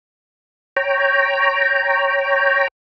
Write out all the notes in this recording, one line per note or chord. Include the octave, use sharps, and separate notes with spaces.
C#5 G5 A#5